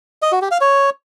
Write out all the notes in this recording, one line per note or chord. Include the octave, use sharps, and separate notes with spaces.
D#5
F#4
G4
F5
C#5